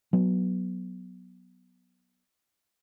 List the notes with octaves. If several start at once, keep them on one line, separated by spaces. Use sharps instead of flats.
F#3 B3